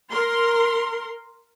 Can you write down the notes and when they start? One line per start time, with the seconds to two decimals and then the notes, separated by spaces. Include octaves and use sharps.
0.13 A#4 C6